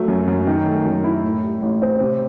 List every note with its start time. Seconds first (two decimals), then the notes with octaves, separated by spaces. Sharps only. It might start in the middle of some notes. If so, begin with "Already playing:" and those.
Already playing: F#3 A3
0.08 F#2
0.28 F#2
0.47 D#3
0.67 A3
0.85 F#2
1.04 E4
1.24 A2
1.43 G3
1.62 A1
1.82 C4
2.00 C3